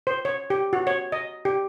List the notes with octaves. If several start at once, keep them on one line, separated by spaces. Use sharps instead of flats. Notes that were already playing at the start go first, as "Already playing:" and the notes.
C5
C#5
G4
F#4
C#5
D#5
G4